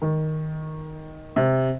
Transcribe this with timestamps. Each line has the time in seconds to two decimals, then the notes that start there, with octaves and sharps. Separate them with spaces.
0.02 D#3
1.36 C3